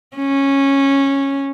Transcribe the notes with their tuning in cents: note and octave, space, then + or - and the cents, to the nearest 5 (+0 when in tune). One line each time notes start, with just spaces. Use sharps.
C#4 -10